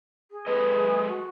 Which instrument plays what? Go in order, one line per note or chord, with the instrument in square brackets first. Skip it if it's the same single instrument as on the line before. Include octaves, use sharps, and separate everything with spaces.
[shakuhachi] G#4
[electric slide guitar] G#3 A4 D#5 [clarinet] B4
[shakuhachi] F#4